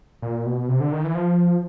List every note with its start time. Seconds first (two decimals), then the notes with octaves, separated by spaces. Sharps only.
0.22 A#2
0.46 B2
0.68 C3
0.80 D3
0.92 D#3
1.04 E3
1.15 F3